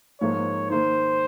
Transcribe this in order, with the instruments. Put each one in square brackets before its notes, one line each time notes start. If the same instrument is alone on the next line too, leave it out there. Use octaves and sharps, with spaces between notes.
[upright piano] G#2 F3 A#3 [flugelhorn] C#5
[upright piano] D#3 A#3 D#4 [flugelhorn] C5